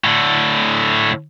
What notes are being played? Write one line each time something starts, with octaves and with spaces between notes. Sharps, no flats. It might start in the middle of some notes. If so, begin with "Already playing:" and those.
A2 D3